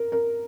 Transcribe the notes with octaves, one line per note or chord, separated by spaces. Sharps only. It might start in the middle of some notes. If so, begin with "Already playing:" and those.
Already playing: A#4
A#4